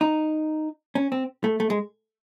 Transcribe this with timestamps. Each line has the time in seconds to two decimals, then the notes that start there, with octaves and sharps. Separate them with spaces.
0.01 D#4
0.95 C#4
1.12 C4
1.44 A3
1.60 A3
1.70 G#3